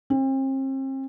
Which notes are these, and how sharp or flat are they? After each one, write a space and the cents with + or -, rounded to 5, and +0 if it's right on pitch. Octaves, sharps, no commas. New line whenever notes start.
C4 +40